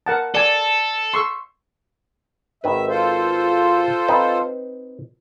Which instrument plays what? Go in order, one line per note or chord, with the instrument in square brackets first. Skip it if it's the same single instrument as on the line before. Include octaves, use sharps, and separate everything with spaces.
[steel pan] A#4 F#5 A5
[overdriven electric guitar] A4 [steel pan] D5 G#5
[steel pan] C6 C#6 E6
[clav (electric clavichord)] G#1 D#3 B4 [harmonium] E5
[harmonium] F4 A4 C5
[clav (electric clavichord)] C4 D#4 B4